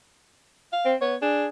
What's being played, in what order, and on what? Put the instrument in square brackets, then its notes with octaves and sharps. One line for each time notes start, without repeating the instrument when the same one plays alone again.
[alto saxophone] F5
[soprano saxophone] C4
[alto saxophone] B3 [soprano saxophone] C#5
[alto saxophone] D4 [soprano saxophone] G#4